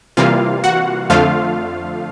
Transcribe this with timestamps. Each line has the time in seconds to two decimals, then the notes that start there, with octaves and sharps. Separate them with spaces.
0.17 C3 E3 G3 A#3 F4 F5
0.64 F#4 F#5
1.10 F2 D3 F3 A3 F4 F5